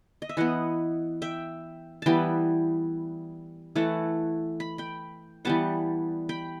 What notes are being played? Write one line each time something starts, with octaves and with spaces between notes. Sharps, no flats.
D#5
E5
E3 B3 D#5 F#5
E5 G5
E3 G3 B3 G5 A5 B5
E3 A3 F#5 A5
B5
G5 B5
E3 G3 B3 F#5 A5
G5 B5